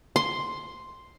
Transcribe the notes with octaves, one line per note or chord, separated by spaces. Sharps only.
C6